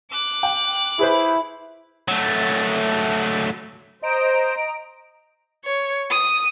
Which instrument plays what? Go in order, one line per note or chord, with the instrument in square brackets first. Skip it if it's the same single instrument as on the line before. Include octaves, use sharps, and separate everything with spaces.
[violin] D6 F#6
[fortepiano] G5
[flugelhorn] E4 [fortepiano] G#4 B4 C5
[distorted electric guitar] F#3 A3
[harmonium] C5 [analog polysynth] D#5 A#5 D7
[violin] C#5
D#6